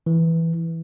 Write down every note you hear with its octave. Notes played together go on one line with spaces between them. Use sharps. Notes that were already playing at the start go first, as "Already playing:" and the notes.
E3